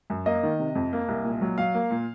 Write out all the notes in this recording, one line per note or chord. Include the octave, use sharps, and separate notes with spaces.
F#2
A#3 D#5
D#3
C3
F2
A#3
C2
A#2
F#3
F#3 F5
A#3
A#2